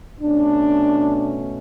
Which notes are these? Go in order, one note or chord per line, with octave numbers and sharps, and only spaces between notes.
B2 A3 C#4 D4